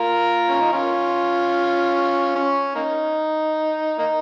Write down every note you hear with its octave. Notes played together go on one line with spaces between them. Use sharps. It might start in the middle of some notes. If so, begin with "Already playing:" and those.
Already playing: F4 A#4
C#4
D#4
C#4 F4
C#4
A#3 D#4
A#3 D#4